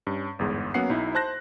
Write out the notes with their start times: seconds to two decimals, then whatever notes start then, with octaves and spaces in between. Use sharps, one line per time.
0.07 G2 C#4
0.39 G1 E2 G#2
0.74 F#3 A#3 B3 C#4 F#5 C7
0.90 B1 D#4 E4
1.15 C5 A5 F#6 A#6